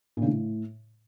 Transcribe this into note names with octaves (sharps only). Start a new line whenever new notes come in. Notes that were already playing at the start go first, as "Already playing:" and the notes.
A#2
C#3
A2